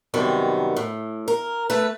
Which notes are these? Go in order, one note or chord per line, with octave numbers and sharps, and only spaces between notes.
F#2 C3 D#3 G3 B3
A2
A#4
A3 B4